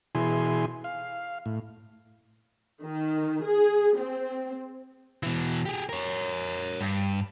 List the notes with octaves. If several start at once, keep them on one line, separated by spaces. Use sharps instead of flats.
B2 E3 E4 G#4 G#5 C6
F5
A2
D#3
G#4
C4
B2 E3
G4 G#4
A#4 C#5
G2